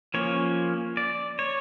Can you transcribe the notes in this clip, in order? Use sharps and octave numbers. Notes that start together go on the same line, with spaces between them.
F3 A#3 C#4 C#5
D5
C#5